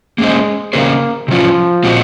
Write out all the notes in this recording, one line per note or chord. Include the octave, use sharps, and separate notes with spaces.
G#3 A#3 C#4 G#4 C5
C#3 F#3 A#3 C#4 G#4 C5
C3 F3 F#3 C#4 F4
A#2 G#3 C4 F#4